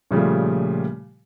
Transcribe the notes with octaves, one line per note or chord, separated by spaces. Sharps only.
A#2 C#3 F3 G3 A3